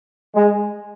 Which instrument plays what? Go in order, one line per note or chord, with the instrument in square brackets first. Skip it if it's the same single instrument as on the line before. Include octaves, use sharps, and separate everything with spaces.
[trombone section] G#3